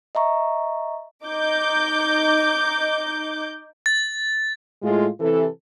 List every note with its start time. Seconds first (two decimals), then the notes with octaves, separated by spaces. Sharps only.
0.15 D#5 E5 A#5 C#6
1.25 D#4 D6 G6
3.86 A6
4.82 A2 G#3 F4
5.20 C3 E3 A4